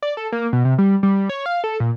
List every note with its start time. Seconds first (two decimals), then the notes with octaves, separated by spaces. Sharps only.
0.02 D5
0.17 A4
0.32 A#3
0.53 B2
0.65 C3
0.78 G3
1.03 G3
1.29 C#5
1.46 F5
1.64 A4
1.80 A#2